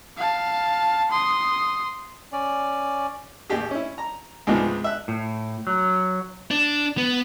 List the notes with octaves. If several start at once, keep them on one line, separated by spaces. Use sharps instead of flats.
F5 A5
C6 D#6
C#4 D5
A1 D#2 G4 G#4
C#4 E4
A#5
C#2 G#2 C3 F3 G#3 B3
E5 F#6
A2
F#3
D4
B3